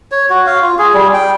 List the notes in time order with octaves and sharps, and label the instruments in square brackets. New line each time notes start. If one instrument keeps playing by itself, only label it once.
[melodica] C#5
F#4
F5
F4
G#4
G3
G5